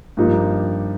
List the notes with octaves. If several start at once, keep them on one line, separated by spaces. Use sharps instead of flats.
G2 F3 A#3 D#4 G4